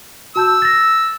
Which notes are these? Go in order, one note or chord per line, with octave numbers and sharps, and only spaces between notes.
F#4 A5 E6 G6
A6 A#6